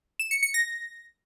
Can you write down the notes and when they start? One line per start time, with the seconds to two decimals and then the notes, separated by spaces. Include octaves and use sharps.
0.19 E7
0.31 C#7
0.43 C#7
0.54 A#6